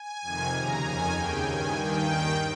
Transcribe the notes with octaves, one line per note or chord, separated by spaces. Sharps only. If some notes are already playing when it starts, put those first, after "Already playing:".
Already playing: G#5
F2 C3 D#3
D#2 C#3 A#5
F2 D#3 G#5
D#2 C#3 G5
G2 D#3 G#5
G2 D#3 G5
D#2 D#3